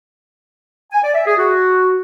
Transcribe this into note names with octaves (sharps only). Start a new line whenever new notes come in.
G#5
D5
E5
G#4
F#4